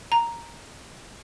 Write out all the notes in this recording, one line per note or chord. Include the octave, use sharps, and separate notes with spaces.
A#5